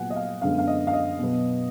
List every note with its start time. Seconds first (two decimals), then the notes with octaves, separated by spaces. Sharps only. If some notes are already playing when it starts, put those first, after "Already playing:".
Already playing: A#2 F#3 B3 F#5 G#5
0.10 D#5
0.16 F5
0.42 F#2 D3 G#3 B3 F5
0.58 F5
0.67 D#5
0.87 F5
0.93 D#5
1.19 B2 F#3 B3